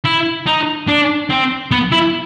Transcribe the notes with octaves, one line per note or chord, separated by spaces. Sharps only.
E4
D#4
D4
C4
B3
E4